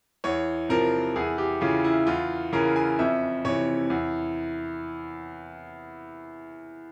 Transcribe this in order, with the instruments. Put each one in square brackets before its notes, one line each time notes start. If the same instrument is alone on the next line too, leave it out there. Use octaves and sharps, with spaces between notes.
[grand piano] E2 C#5
C3 F3 A#4
E2 G#4
G4
C#3 E3 F4
E4
E2 F4
C#3 E3 A#4
G#5
F2 E5
C3 E3 C#5
E2